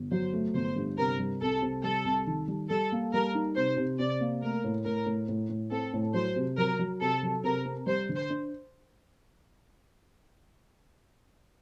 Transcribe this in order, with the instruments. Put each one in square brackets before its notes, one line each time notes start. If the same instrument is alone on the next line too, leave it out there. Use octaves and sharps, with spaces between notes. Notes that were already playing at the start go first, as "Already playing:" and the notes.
Already playing: [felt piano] G1
[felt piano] F#3 [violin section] C5
[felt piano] A3
[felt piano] G1 [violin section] C5
[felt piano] G2
[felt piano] C3 [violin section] A#4
[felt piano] G3
[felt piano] C2 [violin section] A4
[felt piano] C3
[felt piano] G3 [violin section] A4
[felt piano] C2
D#3
G3
[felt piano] G3 [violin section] A4
[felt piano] A#3
[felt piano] G3 [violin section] A#4
[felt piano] D#4
[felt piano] C3 [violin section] C5
[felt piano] C3
[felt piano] C3 [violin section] D5
[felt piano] A#3
[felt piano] A3 [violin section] A#4
[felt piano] A2
[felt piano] A2 [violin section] A#4
[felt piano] A2
A2
A2
[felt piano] C4 [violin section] A4
[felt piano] A2
[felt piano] F#3 [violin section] C5
[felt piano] C3
[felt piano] F#3 [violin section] A#4
[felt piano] F#3
[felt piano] C3 [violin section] A4
[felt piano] F#3
[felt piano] C3 [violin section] A#4
[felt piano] C4
[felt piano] G3 [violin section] C5
[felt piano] D3
[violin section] C5
[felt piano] D4